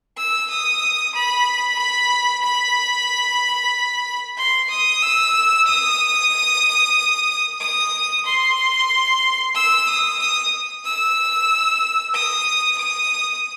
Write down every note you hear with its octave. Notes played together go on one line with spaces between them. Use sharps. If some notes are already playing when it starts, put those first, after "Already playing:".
E6
D#6
B5
B5
B5
C6
D#6
E6
D#6
D#6
C6
E6
D#6
D#6
E6
D#6
D#6